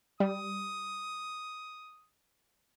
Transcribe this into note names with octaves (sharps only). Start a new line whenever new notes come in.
G3 D#6